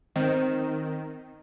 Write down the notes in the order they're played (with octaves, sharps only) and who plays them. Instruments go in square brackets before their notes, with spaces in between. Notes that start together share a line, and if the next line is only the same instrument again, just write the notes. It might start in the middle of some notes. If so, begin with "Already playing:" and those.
[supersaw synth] D#3 [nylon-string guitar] C4